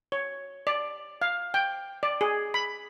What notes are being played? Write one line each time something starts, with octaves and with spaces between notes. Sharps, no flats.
C#5
D5
F5
G5
D5
G#4
B5